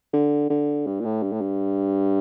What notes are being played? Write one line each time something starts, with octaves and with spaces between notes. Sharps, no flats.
D3
D3
G2
A#2
A2
G2
A2
G2